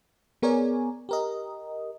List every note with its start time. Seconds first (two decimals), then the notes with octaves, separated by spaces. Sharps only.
0.42 B3 G#4 A#4 C#5 D5 G#5
1.09 G4 A#4 D#5